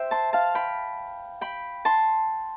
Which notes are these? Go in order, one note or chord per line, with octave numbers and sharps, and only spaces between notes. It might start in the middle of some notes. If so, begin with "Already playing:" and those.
Already playing: C5 E5 G5
A5 C6
F5 A5
G5 B5
G5 B5
A5 C6